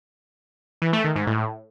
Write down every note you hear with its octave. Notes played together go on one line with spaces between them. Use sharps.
E3
A3
D#3
G#2
A2